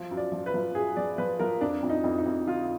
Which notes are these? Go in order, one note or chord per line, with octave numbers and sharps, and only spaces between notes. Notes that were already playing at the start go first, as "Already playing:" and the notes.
Already playing: F3
F#2
D5
F3
B4
F3
F#2 G#4
F3 D5
F3 B4
F3 A#4
F2 D4
F2
D#4
F2
D#4
F2
D3 F4